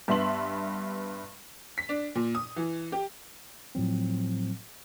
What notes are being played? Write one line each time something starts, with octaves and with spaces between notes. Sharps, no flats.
G2 B3 E5 A5 C6 F#7
B6
D4
A#2
D#6
E3
G4
A2 F3 F#3 C4